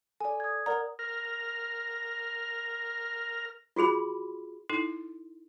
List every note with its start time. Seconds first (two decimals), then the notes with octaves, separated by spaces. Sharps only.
0.20 A4 D5 G#5
0.40 D#6 G#6
0.66 A#4 D5 F#5 A#5
0.99 A#4 F6
3.76 F4 F#4 G#4 B5 C6
4.69 D#4 E4 A4